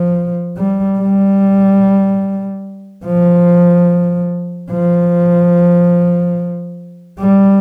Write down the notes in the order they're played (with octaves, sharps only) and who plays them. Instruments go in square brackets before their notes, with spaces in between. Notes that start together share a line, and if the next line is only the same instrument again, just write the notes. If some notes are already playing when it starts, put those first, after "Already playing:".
Already playing: [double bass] F3
G3
G3
F3
F3
G3